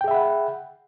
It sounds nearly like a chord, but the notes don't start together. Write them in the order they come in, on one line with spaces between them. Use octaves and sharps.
G5 G#4 E5 B5 F#5